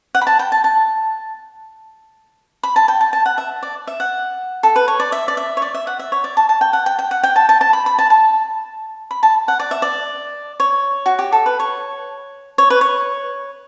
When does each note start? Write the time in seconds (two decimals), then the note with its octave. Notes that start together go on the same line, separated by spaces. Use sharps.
0.15 F#5
0.22 B5
0.27 A5
0.39 G5
0.52 A5
0.64 A5
2.63 B5
2.76 A5
2.88 G5
3.01 A5
3.13 A5
3.26 F#5
3.38 E5
3.63 D5
3.87 E5
4.00 F#5
4.63 A4
4.76 B4
4.88 C#5
5.00 D5
5.12 E5
5.28 D5
5.37 E5
5.57 C#5
5.62 D5
5.74 E5
5.87 F#5
5.99 E5
6.12 C#5
6.24 D5
6.37 A5
6.49 A5
6.61 G5
6.73 F#5
6.86 G5
6.99 G5
7.11 F#5
7.23 G5
7.36 A5
7.49 A5
7.61 A5
7.73 B5
7.86 B5
7.99 A5
8.10 A5
9.11 B5
9.23 A5
9.48 F#5
9.60 D5
9.71 E5
9.82 D5
10.60 C#5
11.06 F#4
11.19 G4
11.32 A4
11.46 B4
11.60 C#5
12.58 C#5
12.70 B4
12.81 C#5